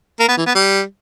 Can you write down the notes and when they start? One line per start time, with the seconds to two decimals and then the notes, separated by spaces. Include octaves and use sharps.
0.20 A#3
0.28 B3
0.37 E3
0.46 B3
0.55 G3